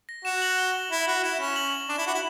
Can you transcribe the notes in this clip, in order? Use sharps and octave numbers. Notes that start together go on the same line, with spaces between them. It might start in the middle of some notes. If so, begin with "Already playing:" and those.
A#6
F#4 E7
F#7
G7
E4
F#4
E4 E7
C#4
F#7
F#7
D4 E7
E4
F#4
E4